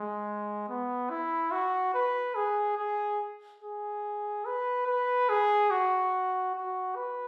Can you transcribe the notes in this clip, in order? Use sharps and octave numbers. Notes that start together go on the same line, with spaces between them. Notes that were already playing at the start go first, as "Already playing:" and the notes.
Already playing: G#3
B3
E4
F#4
B4
G#4
G#4
G#4
B4
B4
G#4
F#4
F#4
B4